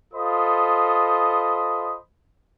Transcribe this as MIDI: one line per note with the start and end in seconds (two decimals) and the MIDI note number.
0.14 1.98 65
0.14 1.98 69
0.14 1.98 72
0.14 1.98 75
0.14 1.98 83
0.14 1.98 87